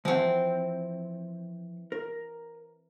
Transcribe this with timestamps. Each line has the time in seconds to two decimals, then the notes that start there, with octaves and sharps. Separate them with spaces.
0.05 E3 F3 C4 F#5
1.92 A#4